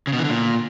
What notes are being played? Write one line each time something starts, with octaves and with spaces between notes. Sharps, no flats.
C#3
B2
E3
D3
A#2